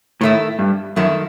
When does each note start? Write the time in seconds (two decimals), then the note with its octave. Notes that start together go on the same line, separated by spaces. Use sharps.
0.21 A2 D#3 A3 E4
0.59 G2
0.96 F#2 D#3 A3 E4